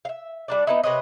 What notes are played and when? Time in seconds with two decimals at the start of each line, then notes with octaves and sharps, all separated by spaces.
0.05 E5 F5
0.48 G3 D4 D5
0.67 B3 D#4 E4
0.83 C3 B4 C#5 D#5